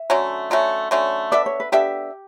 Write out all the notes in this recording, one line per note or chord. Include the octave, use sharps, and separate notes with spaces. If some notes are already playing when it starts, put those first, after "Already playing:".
Already playing: E5
D3 F#3 A3 C#4
D3 F#3 A3 C#4 F#5
D3 F#3 A3 C#4
B3 D4 A4 D5 E5
C#5
B4
B3 D4 G4 A4 E5